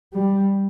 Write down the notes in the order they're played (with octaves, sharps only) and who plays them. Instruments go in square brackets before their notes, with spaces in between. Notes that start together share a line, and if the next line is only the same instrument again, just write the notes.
[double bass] G3